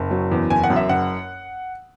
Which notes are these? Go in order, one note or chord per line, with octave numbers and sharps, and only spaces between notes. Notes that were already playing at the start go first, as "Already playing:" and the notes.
Already playing: F#1
F#3
E2
F#1 G#5
F#5
F#2
E5
F#1 F#5